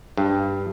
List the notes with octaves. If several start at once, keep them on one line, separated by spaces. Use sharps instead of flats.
G2